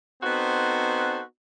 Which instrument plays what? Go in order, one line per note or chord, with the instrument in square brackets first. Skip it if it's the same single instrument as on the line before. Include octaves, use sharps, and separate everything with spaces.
[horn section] B3 C4 D#4 F#4 A4 C5